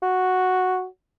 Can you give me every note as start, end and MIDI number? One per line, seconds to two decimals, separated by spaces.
0.03 0.86 66